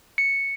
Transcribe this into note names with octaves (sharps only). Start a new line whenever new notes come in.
C#7